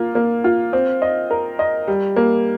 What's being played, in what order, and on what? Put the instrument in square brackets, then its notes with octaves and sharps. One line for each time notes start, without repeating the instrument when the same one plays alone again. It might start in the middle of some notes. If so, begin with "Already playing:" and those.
Already playing: [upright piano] A#3 F4
A#3
F4
C4
D#5
A#4
D#5
G3
A#3